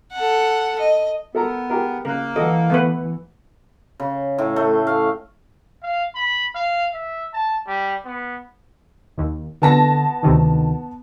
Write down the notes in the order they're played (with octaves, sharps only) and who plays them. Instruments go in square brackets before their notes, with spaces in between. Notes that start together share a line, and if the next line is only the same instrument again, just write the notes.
[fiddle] A4 F#5
D#5
[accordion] B3 [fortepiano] A4 A#4 A#5
[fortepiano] G4 G#4 A#4
[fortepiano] C#3 F#6 [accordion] A#3 [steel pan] A#4
[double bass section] E3 [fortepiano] A4 F#5 [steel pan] D#5
[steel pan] A3 B3 B4
[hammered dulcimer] C#3
A2
A3
F5
[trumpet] F5
B5
F5
E5
A5
G3
B3
[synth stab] D#2
[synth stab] D3 [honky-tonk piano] B3 A5 A#6
[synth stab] D2 C3 D#3